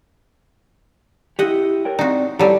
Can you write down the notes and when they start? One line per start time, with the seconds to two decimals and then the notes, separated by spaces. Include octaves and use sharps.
1.39 E4 G4 D#5 F#5
1.85 A#4 C#5 G5
1.99 C4 D#4 F#4 D5
2.39 F#3 G3 E4 G4 A4